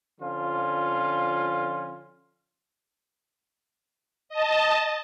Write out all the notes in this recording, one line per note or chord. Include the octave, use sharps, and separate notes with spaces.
D3 F3 C#4 F4
D#5 A5